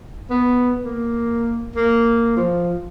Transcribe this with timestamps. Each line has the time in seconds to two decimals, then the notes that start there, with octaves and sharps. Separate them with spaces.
0.30 B3
0.85 A#3
1.76 A#3
2.36 F3